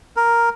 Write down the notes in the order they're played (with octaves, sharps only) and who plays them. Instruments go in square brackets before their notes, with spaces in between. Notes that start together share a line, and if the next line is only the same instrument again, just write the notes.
[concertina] A#4